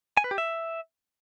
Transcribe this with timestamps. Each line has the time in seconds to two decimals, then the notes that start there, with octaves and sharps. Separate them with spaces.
0.17 G#5
0.24 B4
0.31 G4
0.38 E5